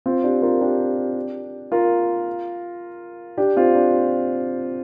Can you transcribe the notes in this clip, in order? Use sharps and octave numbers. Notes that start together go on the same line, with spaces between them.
C4 F4
D4 G4
F4 A#4
D4 G4
F4 A#4
D4 G4
C4 F4
D4